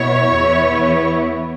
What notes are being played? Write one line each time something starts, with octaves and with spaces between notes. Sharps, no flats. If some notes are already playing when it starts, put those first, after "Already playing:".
Already playing: B2 B3 E4 C#5
E2 E3 B3 E4